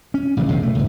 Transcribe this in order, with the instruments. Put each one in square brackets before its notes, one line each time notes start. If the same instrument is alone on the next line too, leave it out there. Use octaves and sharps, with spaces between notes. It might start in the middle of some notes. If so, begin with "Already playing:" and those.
[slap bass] C#4
A1 C#3 F#3
E1 C#2 G2 C3
A3
C#2 G#2